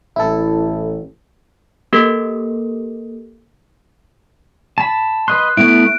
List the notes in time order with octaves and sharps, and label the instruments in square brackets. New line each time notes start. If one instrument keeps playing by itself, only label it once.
[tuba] A1 [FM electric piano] E4 A4
[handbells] A#3 G4 A4 A#4
[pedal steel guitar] A5 B5
[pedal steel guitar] B4 D#5 C6 [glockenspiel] F#6
[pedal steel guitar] A3 B3 E4 [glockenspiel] D7